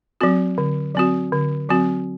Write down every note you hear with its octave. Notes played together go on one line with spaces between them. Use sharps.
F#3 C4 F#4
D3
F#3 C4 F#4
D3
F#3 C4 F#4